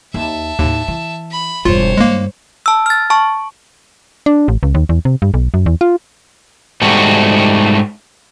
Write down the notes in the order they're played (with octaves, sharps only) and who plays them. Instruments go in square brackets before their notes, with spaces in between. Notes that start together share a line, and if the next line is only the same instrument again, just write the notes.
[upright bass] D#2 [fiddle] E5 A5
[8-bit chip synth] D#2 [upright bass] A2 D#4
[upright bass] E3
[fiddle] B5
[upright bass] E1 G2 [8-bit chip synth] F4 [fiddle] C5 C#5
[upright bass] G2 D#3 [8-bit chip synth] G#3 A#3
[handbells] A5 E6
F6 A6
A5 C#6
[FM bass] D4
A1
C#2
D#2
E2
C3
G2
B1
F#2
E2
F4
[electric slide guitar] G#2 G3 A3 F#4